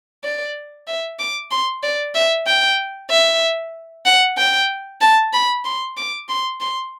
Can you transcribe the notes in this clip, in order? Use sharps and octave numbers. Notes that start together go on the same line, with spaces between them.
D5
E5
D6
C6
D5
E5
G5
E5
F#5
G5
A5
B5
C6
D6
C6
C6